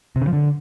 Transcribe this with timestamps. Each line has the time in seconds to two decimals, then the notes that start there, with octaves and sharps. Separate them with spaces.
0.16 C3
0.22 C#3
0.27 F3
0.33 D3